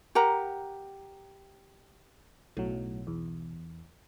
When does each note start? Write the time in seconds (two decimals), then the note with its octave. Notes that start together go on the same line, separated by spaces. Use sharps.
0.15 G4 A#4 F#5 A#5
2.57 B1 A2 F#3
3.07 E2